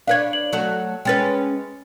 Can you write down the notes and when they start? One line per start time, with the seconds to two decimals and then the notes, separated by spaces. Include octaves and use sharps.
0.07 D4 B4 C#5 F5 G#6
0.33 F#7
0.52 F#3 A3 F#4
1.05 G#3 C#4 B4 G5 A6